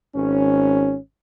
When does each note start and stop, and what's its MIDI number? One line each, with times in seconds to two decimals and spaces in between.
0.14 0.97 32
0.14 0.97 61